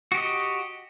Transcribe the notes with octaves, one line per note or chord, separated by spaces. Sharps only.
F#4 G4 D#5